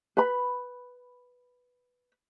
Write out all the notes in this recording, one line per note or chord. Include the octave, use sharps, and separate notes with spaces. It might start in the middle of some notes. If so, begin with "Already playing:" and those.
B4 B5